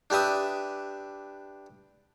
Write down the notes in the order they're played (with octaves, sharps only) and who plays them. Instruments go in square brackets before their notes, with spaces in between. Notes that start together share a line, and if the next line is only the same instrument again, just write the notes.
[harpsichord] D4 G4 B4 E5 D#6